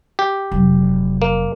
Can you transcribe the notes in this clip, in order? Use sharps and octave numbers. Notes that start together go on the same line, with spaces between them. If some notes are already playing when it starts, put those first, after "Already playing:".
G4
F1 F#3
A#3